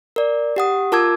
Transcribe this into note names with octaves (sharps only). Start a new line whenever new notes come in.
A#4 D5
G4 F#5 D#6
F4 A#4 A5 D6 E6 G#6